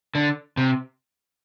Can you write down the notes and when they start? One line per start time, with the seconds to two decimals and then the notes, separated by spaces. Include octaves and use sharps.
0.15 D3
0.57 C3